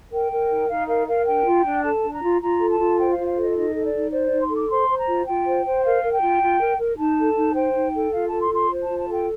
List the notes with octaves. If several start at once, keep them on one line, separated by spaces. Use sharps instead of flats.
A#4 G5
A#4
D#4
D#4 F5
A#4 F5
A#4 F5
D4 G5
F4
D4
A4 A5
D4
A#5
F4
F4 A#5
A4
A5
F4
C5 G5
F5
F4
F5
A4 D#5
D#4 D#5
A4
D5
D#4
C5 D5
D#4 D5
C6
A4
D6
C5 C6
C5
A#5
F4
F4 G5
C5
C5
A#4 F5
A#4
G5
F4
F4
A#4
A#4
D#4 A5
A4
D#4
C5 G5
D#4
A4
F4 F5
A4 A5
C6
F4 C6
C5
F4 A5
A5
A4 G5